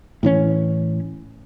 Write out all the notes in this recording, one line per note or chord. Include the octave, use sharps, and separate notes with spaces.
A2 E3 C#4